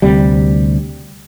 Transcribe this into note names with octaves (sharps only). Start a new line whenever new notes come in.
D2 C3 G3